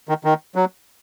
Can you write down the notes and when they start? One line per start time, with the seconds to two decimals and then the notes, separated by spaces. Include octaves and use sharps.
0.09 D#3
0.24 D#3
0.56 F#3